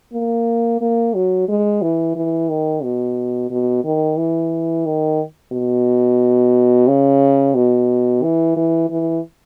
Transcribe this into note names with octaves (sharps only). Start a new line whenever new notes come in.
A#3
A#3
F#3
G#3
E3
E3
D#3
B2
B2
D#3
E3
D#3
B2
C#3
B2
E3
E3
E3